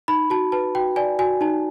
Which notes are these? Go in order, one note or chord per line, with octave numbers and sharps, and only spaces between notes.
D#4 B5
F#4 A5
B4 A5
F#4 G5
D5 G#5
F#4 G#5
D#4 A5